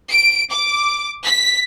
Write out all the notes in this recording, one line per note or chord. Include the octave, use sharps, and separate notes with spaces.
D7
D6
B6